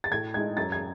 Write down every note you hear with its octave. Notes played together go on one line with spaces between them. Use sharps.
A6
A2 G#6
G#3 D#4 G#6
F#2 A6
G#6